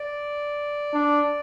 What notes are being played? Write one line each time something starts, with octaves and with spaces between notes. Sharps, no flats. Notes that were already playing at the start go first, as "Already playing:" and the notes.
Already playing: D5
D4